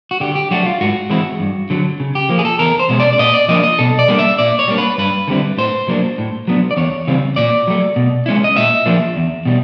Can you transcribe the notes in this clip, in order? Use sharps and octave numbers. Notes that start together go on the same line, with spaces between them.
F#4
D3 G4
G4
F#3 A3 D4 F#4
F4
G#2 F#4
E3 G#3 C4 E4
G2
D3 F#3
C#3
G4
F3 A#3
G#4
A4
E2 A#4
C5
B2 G#3 C#4
D5
D5
A#2 D#5
D5
F3 A#3 D4 D#5
D#5
B2 A4
D5
G3 A#3 D4
E5
A#2 D5
C#5
G3 A#3 D4
B4
G2 B4
D3 G3 C4 E4
A2 C5
F#3 A#3 D4
A2
F#3 B3 D4
D5
E2 C#5
C#3 E3 G3 C4
A#2 D5
F#3 A3
B2
G#3 C#4 E4
D#5
A#2 E5
F3 A#3 D4
E2
B2 G3